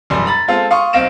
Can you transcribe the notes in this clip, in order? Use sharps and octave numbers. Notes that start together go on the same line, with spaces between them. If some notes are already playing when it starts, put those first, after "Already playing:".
E1 F#2 G3 C6
A#5 B5 A6
G#3 C4 F4 A4
F5 C6 C#6 D#6
B1 C4 F5 A#6 D7 E7